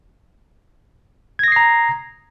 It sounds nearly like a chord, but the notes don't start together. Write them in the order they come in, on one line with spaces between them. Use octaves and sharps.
G#6 A#6 D#6 C7 A#5